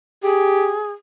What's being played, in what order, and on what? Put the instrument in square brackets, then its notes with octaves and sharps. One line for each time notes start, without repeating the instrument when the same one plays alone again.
[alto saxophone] G4 [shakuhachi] G#4